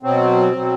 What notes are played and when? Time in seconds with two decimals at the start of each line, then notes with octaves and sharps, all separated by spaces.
0.03 B2 F#3 C4
0.53 B2 F#3